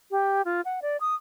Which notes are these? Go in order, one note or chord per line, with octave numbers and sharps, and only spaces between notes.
G4
F4
F#5
D5
D#6